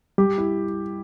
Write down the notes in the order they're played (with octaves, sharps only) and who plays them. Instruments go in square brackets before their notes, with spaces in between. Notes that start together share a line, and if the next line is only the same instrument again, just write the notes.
[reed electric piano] G3 [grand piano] G4
[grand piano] E4